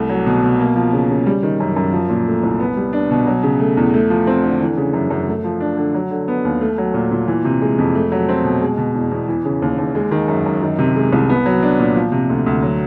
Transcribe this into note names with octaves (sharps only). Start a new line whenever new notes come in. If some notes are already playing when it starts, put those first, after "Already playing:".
Already playing: C2 A3
F#3
B2
B2
A#3
F3
C#3
C#3
G3
D#3
F#2
F#2
F3
A#2
A3
C2
B3
G3
D4
B2
F#3
C#3
A3
E2
A3
F3
C4
D3
E3
C#3
F#2
F#2
A3
F3
D4
D3
F#3
D3
B3
D#2
A3
F#3
A#2
A#2
E3
C3
G#3
F2
A3
F#3
C4
B2
G#3
B2
E2
E2
E3
C#3
D#2
D#2
G#3
D#3
F#2
F#2
D#3
C3
G#3
C2
B3
F#3
D4
A#2
F3
C3
D2
D2
F#3